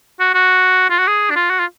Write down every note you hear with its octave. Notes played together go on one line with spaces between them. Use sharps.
F#4
F#4
F4
F#4
G#4
D4
F4
F#4
F4